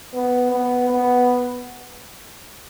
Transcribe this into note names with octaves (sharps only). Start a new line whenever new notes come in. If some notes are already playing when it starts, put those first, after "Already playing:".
B3
B3
B3